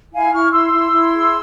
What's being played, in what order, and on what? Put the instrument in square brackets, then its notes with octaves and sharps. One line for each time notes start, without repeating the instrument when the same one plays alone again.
[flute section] E4 F5 G#5
E4 C#6 F6
E4 C6 E6
E4
E4
G#4